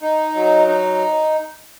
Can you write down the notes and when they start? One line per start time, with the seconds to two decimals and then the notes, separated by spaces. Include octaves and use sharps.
0.02 D#4
0.34 F#3
0.67 D#4